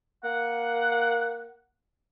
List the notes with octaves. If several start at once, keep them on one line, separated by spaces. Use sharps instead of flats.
A#3 F#5